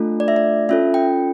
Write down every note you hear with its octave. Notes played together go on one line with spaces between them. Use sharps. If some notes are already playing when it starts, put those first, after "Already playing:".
Already playing: A3 D4 F4 A4
D5
E5
D5
C#4 F4 A4 E5
G5